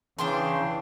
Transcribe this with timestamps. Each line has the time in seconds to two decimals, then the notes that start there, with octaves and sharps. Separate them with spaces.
0.19 C#3 E3 D4 G5 C6